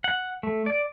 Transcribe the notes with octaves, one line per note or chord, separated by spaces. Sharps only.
F#5
A3
D5